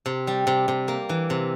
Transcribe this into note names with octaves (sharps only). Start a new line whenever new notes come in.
C3
G3
C3
C3
A#3
E3
C3